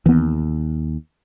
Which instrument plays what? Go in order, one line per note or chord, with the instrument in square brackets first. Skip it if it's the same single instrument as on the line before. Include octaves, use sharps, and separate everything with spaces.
[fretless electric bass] D#2 [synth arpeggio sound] E3 B3